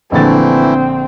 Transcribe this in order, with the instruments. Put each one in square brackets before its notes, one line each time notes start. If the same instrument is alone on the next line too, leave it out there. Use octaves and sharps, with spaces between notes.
[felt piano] A#1 D3 A6 [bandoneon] E3 A3 E4 [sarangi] C4